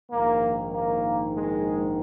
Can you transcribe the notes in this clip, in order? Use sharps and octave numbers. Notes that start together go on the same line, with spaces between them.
A#1 G#2 D#3 A#3
A#3
G#3